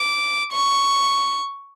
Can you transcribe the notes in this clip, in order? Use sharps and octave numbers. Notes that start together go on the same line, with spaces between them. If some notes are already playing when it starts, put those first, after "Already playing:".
Already playing: D6
C#6